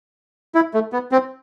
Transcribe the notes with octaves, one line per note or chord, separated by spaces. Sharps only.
E4
A3
B3
C4